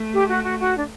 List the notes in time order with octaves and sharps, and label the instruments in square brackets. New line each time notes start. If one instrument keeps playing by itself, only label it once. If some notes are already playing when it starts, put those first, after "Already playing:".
Already playing: [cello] A3
[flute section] G4
F#4
F#4
F#4
D4